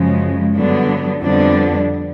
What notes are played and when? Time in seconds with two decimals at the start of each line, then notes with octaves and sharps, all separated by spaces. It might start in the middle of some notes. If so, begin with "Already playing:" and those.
Already playing: F#2 C#3 F3 G#3
0.55 G2 D3 F#3 B3 D4
1.21 F2 D3 G3 B3 D4